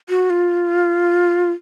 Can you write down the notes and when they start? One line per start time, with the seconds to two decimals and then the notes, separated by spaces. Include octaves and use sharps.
0.09 F#4
0.30 F4